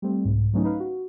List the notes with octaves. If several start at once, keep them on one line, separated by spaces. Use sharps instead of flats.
G3 A3 C4
C2 G#2
D#3 F#3 A3 B3 C#4 D#4
D#4 B4 F5
F#4